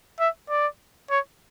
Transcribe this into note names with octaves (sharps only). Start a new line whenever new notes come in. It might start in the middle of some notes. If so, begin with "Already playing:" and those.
E5
D5
C#5